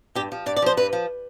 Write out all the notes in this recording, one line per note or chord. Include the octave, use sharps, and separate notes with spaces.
G2 G4
F3
G2 D5
D5
F3 C5
G2 B4
F3